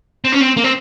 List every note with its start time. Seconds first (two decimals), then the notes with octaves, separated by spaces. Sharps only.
0.25 C4
0.32 C#4
0.41 C4
0.57 A#3
0.64 C4